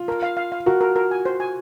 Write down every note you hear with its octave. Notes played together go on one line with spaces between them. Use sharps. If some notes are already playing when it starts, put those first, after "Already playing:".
Already playing: F4
A#4
F5
F5
F5
F#4 A#4
A#4
A#4
G#5
C5
G#5